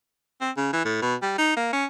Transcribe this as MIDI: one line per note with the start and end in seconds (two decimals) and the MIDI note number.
0.41 0.51 60
0.57 0.72 49
0.73 0.85 52
0.85 1.00 45
1.02 1.15 47
1.22 1.34 55
1.38 1.56 63
1.57 1.72 58
1.73 1.86 61